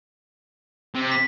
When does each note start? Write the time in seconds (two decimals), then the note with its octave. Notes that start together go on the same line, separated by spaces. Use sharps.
0.95 C3
1.11 B6